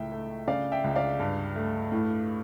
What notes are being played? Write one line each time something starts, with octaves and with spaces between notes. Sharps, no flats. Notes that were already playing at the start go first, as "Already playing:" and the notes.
Already playing: C#2 A2 E5 G5
A3
C#3 D5 F5
E5 G5
C#2
D5 F5
G2
A3
A2